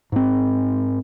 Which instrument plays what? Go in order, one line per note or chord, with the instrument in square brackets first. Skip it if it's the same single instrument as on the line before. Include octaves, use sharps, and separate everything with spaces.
[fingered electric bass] G#2 C4